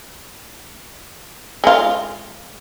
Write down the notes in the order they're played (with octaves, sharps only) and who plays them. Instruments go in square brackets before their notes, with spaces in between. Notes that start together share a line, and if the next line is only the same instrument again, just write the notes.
[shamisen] G#3 F4